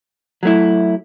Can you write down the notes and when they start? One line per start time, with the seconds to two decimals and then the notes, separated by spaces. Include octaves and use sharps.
0.43 F#3 A3 E4